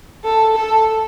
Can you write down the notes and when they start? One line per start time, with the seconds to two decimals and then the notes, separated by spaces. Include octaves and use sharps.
0.24 A4
0.56 A4